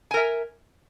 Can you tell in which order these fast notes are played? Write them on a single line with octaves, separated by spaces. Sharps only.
G#5 A#4 E5